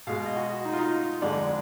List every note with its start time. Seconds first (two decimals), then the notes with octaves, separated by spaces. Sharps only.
0.07 B2 G#3 F5
0.26 D#5
0.36 F#4
0.65 D#4
0.73 F4
0.79 D#4
1.22 F2 D3 G#3 D4